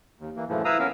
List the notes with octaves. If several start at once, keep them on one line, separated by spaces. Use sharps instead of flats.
D#2
E3 A#3
F#2 A2 C#3 E3 F3
E4 B4 F5 A#5 D#6 E6
B3 C#4 A#4 F5